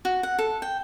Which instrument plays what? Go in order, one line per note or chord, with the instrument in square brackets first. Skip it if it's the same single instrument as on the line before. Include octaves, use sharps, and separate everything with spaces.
[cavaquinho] F#4
F#5
A4
G5